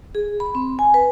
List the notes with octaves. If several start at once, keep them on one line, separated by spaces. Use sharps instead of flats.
G#4
B5
C4
G#5
B4